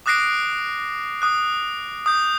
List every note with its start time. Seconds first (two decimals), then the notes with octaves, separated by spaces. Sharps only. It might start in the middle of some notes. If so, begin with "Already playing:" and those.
0.06 D6 D#6 F#6 A#6 C7 D7
1.22 D#6 F#6
2.06 D#6 G6